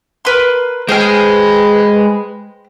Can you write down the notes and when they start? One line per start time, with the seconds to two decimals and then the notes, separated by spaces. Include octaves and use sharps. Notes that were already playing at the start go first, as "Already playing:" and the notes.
0.25 A#4 B4 C6
0.89 G#3 G#4 B4 C5 G5 F6